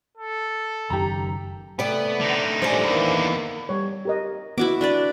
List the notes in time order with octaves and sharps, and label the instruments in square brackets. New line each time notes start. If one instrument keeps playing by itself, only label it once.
[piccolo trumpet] A4
[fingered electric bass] F#1 F#2 D#3 [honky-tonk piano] G4 A#5
[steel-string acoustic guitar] C3 D5 [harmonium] A3 [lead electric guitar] B3
[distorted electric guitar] D3 D#4
[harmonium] A#2 G3 A3 [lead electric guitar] F3 C#4 [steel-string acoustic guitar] C5 D5
[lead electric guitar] E2 [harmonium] D#3 E3 A#3
[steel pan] G3 C#5
G4 A#4 D#5
[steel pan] B3 [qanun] E4 F#4 D6
[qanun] D4 B4 D5